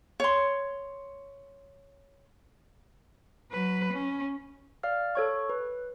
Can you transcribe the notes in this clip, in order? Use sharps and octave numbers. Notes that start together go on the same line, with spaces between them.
C#5 C6
F#3 B4
C#4
D5 F5 F6
A4 C#5 C#6
B4